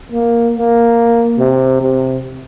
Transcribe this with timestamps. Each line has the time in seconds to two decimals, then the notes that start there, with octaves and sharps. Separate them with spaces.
0.12 A#3
0.55 A#3
1.39 C3
1.81 C3